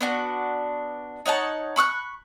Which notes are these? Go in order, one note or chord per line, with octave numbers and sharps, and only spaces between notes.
B3 D4 F#4
D#4 C#5 F#5 A5
B5 C#6 E6 F#6